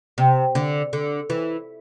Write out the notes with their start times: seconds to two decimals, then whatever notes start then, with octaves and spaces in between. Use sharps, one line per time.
0.18 C3
0.55 D3
0.93 D3
1.30 E3